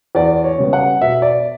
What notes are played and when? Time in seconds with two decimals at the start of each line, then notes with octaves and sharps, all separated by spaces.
0.15 E2 D5
0.44 C#5
0.58 C#3 G3 B3
0.73 F#5
1.01 B2 E5
1.22 D5